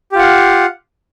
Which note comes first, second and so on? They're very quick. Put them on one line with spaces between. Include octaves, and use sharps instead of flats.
G4 F4 F#5 F5